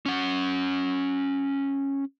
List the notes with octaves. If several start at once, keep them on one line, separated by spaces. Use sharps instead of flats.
C#4 F#5